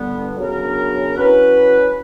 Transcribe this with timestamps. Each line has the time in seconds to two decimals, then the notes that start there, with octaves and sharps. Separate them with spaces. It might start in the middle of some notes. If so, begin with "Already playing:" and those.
Already playing: G2 D3 G3 B3
0.38 C#3 F#3 B3 D4 A#4
1.15 F#3 C#4 E4 B4